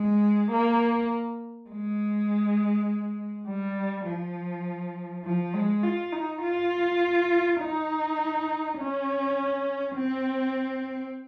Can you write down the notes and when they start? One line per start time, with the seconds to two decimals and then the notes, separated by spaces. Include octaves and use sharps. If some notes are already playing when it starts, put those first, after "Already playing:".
Already playing: G#3
0.52 A#3
1.70 G#3
3.48 G3
4.06 F3
5.25 F3
5.54 G#3
5.84 F4
6.12 D#4
6.42 F4
7.60 D#4
8.78 C#4
9.96 C4